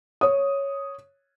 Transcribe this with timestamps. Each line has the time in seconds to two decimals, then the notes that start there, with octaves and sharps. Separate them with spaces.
0.21 C#5 D#6